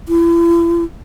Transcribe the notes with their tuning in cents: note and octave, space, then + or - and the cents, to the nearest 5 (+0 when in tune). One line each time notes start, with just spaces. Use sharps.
E4 +40